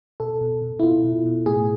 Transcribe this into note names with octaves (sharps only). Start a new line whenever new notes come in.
B2 A4
B2
B2
E4
B2 F4
B2
B2
A2 G#4